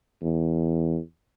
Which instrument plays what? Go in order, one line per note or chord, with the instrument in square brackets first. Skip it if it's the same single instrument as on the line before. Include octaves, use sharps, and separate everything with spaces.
[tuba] E2